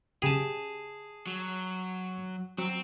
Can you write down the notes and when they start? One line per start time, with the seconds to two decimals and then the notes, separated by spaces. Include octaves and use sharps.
0.22 C#3 G4 G#4 A5
1.27 F#3
2.58 F#3 C4